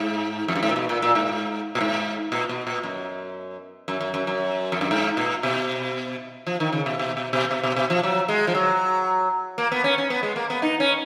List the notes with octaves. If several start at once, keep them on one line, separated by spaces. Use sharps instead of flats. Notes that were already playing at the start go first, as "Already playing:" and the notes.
Already playing: G#2
F2
F#2
G#2
A#2
B2
A#2
A#2
G#2
A#2
G#2
A#2
B2
A#2
F#2
F#2
F#2
F#2
F#2
F2
F#2
G#2
A#2
B2
F3
D#3
C#3
B2
B2
B2
B2
B2
B2
B2
F3
F#3
G#3
F3
F#3
A#3
B3
C#4
C#4
B3
G#3
A#3
B3
D#4
C#4